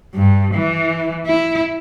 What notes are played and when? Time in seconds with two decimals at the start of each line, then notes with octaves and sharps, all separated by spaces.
0.15 G2
0.54 E3
1.27 E4